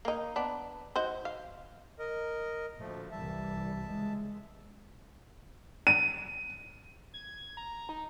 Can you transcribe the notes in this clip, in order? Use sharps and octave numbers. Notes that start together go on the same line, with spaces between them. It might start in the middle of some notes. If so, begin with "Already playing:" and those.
A#3 D#4
B3 D4
D#4 F#4 C5
F5
A#4 D#5
D2 A#2 F3 A3
C2 E3 G3 E5 A5
C#2 G#3
D#7
G#6
A#5
D#4